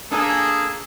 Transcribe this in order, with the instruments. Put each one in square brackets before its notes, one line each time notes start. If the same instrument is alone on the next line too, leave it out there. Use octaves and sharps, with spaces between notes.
[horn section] A#3 G#4 A4 [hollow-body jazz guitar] D4 G#5